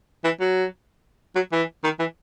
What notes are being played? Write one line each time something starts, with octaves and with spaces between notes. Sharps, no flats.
E3
F#3
F#3
E3
D#3
E3